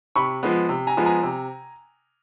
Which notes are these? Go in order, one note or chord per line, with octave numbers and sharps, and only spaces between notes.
C3 B5 C#6
F3 G#3 B3
C3
G#5 A#5
F3 G#3 B3
G#5 A#5
C3